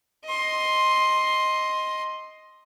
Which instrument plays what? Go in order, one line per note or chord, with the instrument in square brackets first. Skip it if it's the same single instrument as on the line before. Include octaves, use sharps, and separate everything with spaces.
[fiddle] D#5 C6